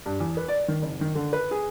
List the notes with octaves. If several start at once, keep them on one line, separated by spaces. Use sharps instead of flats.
G2
E2
B4
D5
D#3
F#1
D#3
D3
B4
G#4